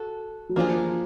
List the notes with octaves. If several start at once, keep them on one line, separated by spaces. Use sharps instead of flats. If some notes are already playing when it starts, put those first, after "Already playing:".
Already playing: F#4 A4
F#3
F3 A#3 D4 F4 G#4